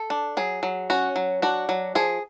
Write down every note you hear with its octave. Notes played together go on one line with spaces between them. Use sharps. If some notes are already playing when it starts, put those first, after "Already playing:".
Already playing: A4
D4
F#3 G#4
F#3
C#4 F#4
F#3
D4 F#4
F#3
F3 G#4